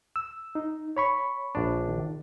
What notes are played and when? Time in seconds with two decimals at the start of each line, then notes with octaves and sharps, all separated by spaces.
0.16 E6
0.55 D#4
0.97 C#5 B5 C#6
1.55 A#1 D4
1.89 D#3